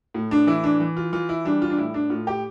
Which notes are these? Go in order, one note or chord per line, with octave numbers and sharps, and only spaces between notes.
A2
D4
E3 E4
D4
E3
F4
E3 F4
E4
G3 D4
F4
D4
A2 E4
D4
A2 F4
G4